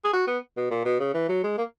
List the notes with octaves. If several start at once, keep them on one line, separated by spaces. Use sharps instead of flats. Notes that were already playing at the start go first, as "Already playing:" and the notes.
G#4
F#4
B3
B2
A#2
B2
C#3
E3
F#3
G#3
A#3